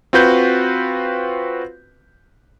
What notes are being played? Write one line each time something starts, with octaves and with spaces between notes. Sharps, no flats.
C4 F4 F#4 B4 G6